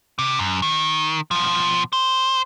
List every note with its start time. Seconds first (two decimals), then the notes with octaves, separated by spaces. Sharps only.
0.19 C3
0.39 F#2
0.62 D#3
1.31 B2 F3
1.93 C5